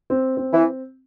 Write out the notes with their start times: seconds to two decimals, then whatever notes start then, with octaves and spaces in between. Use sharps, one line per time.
0.10 C4
0.37 C4
0.53 E3